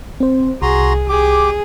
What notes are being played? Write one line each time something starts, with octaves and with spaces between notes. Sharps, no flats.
C4 C5
C2 F#4 G#4 A#5 C6
G4 G#4 D6